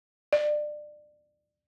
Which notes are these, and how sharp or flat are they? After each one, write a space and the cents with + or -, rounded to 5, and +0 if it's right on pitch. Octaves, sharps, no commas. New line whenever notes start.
D5 +25